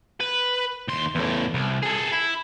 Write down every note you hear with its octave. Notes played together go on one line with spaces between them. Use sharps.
B4
D#2 C6
E2 A2
C2
G#4 A4
E4